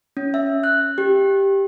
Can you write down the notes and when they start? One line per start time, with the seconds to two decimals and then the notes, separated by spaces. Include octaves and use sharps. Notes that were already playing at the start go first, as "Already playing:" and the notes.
0.17 C#4
0.34 E5
0.64 F#6
0.98 G4